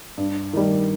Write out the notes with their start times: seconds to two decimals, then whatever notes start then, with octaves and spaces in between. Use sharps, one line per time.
0.17 G2
0.53 D#3 G3